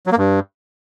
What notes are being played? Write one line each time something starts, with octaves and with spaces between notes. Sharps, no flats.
F#3
A#3
G2